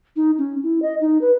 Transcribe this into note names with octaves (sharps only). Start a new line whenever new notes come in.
D#4
C#4
E4
D#5
D#4
B4